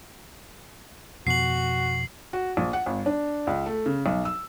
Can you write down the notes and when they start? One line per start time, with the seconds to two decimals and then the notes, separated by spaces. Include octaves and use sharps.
1.27 F2 B2 F#4 C7 F#7
2.33 F#4
2.57 A#1
2.73 F#5
2.86 G1
3.06 D4
3.47 C#2
3.66 A3
3.86 C#3
4.06 B1
4.25 E6